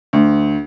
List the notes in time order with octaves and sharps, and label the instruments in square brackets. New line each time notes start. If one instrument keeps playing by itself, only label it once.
[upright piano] D2